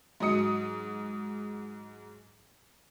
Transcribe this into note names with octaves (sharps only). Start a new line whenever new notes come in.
G#2 F#3 D#5 D#6 C#7